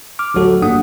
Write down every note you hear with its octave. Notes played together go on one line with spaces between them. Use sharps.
D6 F6
A1 D2 F#3 F#4 A4
A1 G2 A#3 D4 F#5 D#6